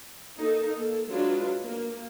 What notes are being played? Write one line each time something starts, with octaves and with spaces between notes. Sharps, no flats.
A#3 D#4 A4
A#3 A4
F#3 G#3 D4 F4 B4
A#3